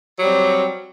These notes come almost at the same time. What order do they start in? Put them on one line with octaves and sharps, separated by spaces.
F#3 G3 C4